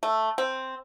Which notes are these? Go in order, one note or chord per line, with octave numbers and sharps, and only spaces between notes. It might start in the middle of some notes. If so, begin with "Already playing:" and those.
A3
C4